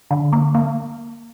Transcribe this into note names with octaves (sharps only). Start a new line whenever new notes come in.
D3
A#3
A#3